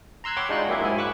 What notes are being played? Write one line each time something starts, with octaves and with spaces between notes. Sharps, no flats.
A#5 C6 E6 F#6 G#6
C#5 F#5 G5 B5 C6 D6
G#3 D4 D#4 F4 F#4 F#6
F#3 A#3 E4 G4 G#4 E5
G#2 E4 G#5
B5 C#6 D6 E6 F#6